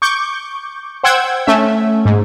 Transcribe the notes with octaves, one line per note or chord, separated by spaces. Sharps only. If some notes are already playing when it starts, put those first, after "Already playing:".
C#6 D6 G6
C5 F#5 G5 E6 G#6
A3 C#4 E5
G#2